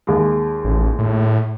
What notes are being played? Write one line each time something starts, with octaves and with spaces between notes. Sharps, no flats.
D#2 G#3
A1
A2